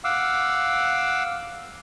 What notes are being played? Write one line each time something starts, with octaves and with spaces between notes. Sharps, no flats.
F5 F#5 D6 E6